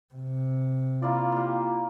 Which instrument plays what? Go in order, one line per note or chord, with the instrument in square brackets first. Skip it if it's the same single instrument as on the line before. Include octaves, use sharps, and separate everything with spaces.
[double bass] C3
[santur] A#3 E4 D5 [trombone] F4
[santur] A#3 G4